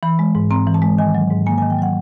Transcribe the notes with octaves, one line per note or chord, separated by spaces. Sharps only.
E3 B5
G#3
G#2
C4 A#5
E3
A5
G#3
D#3 G#5
F#3
G#2
A#3 G#5
G#5
D#3
G5
F#3 F#5